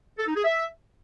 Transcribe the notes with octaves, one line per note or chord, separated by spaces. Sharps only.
A4
D#4
G#4
E5